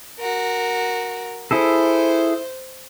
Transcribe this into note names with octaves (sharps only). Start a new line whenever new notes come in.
F#4 A#4
E4 G#4 A4 C5